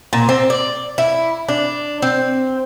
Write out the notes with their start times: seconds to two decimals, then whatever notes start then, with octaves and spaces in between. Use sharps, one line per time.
0.13 A#2
0.29 C4
0.50 D5
0.98 E4
1.48 D4
2.02 C4